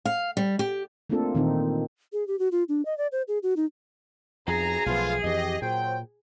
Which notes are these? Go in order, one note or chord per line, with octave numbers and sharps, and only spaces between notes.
F5
G3
G4
A3 A#3 C4 D4 F4 A4
A#2 D#3 E3 C4 D#4
G#4
G4
F#4
F4
D4
D#5
D5
C5
G#4
F#4
D#4
B1 F2 G#4 A#5
B1 E3 F3 A3 B3 F4
F2 E3 G4 D#5
A#2 F#3 C5 G5